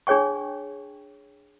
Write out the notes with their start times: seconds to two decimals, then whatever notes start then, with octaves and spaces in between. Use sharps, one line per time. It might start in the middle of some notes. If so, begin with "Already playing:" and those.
0.07 D4 G#4 C#5 G5 C#6